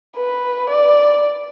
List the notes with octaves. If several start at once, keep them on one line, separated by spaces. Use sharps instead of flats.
B4
D5